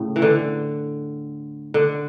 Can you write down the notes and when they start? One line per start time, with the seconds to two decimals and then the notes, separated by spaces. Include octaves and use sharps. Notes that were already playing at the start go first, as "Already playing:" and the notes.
Already playing: A2 C#3
0.16 E3
0.22 D3
1.74 D3